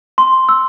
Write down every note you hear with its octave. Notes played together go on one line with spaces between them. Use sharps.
C6
E6